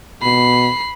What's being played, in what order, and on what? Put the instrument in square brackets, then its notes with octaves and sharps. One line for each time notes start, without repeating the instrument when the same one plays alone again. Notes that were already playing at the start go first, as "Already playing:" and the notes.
[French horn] B2 [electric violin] B5 C7